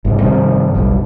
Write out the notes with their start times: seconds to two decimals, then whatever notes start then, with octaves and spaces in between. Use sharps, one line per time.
0.05 G1 G#2 C3
0.22 G2 C3 D#3 F3
0.75 F#1 B1 G2